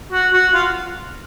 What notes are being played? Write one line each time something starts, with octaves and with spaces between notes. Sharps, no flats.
F#4
F#4
F4